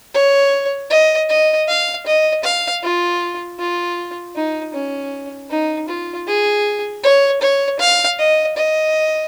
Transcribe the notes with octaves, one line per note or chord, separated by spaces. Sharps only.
C#5
D#5
D#5
F5
D#5
F5
F4
F4
D#4
C#4
D#4
F4
G#4
C#5
C#5
F5
D#5
D#5